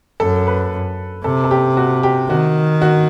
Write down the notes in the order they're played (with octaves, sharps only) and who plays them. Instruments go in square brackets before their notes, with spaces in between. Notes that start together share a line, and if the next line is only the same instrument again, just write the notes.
[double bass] F#2 [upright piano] A4
[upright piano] B4
[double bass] C3 [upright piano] A4
[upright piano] A4
G4
F#4
G4
[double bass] D#3 [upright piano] F#4
[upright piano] F#4